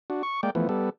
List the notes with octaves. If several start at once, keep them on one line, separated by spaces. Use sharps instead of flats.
D4 F#4
C#6
G#3 A#3 D5 G5
E3 F3 A3 B3
G3 B3 A4